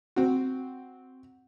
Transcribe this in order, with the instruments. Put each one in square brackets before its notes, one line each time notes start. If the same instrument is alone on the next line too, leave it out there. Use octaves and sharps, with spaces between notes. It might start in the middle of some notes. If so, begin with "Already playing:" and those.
[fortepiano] C4 F#4